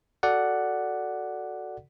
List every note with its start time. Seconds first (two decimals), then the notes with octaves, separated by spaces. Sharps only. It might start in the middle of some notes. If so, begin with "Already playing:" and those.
0.23 F#4 A4 D5 F#5